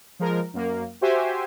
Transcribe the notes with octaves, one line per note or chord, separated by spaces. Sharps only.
F3 G#3 A#4
F#2 A#3
F#4 G4 C5 E5 G#5